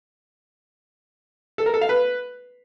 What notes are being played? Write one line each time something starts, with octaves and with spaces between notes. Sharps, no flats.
A4
A#4
A4
F5
B4